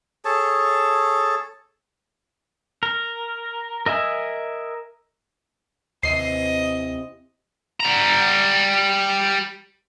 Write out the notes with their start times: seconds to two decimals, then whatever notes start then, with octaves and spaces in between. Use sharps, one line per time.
0.25 G#4 A4 C#5 A5
2.83 A#4
3.86 A#4 D#5 E5 G#5
6.03 D#2 C3 E3 D#5 C7
7.80 G3 A#5